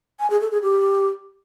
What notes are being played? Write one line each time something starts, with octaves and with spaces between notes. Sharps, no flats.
G#5
G#4
A4
G#4
G4